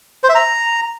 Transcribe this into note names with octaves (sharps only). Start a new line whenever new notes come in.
C5
E5
A#5